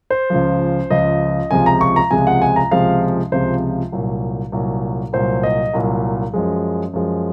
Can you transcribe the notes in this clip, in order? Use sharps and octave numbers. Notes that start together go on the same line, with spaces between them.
C5
C#2 C#3 F3
C#2 C#3 F3 D#5
C#2 C3 F3 G#3 G#5
A#5
C#6
A#5
C#2 C3 F3 G#3 G#5
F#5
G#5
A#5
C#2 C3 F3 G#3 F5
C#2 C3 F3 G#3 C5
C2 A#2 F#3
C2 A#2 F#3
C2 A#2 F#3 C5
D#5
C2 A#2 F#3
F#2 F3 G#3
F#2 F3 G#3